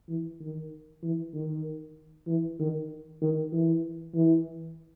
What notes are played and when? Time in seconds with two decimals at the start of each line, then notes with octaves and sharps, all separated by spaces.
0.09 E3
0.40 D#3
1.03 E3
1.34 D#3
2.27 E3
2.59 D#3
3.22 D#3
3.53 E3
4.14 E3